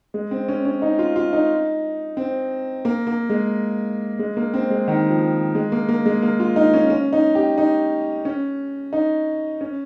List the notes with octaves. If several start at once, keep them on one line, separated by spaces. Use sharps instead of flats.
G#3
C4
C#4
C#4
D#4
F4
F4
D#4
C4
A#3
A#3
G#3
G#3
A#3
C4
G#3
D#3
F3
G#3
A#3
A#3
G#3
A#3
F4
D#4
C#4
C#4
D#4
G4
D#4
C#4
D#4
C#4